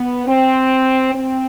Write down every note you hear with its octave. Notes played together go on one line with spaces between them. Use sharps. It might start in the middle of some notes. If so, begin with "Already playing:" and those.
Already playing: B3
C4
C4